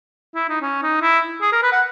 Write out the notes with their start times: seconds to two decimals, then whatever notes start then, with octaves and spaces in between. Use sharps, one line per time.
0.35 E4
0.49 D#4
0.61 C#4
0.83 D#4
1.01 E4
1.41 G#4
1.52 A#4
1.62 B4
1.72 F#5